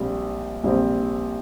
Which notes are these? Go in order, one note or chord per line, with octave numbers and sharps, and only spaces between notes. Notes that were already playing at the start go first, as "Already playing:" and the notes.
Already playing: A#1 A#2 G3 C4
A#1 A#2 G3 C4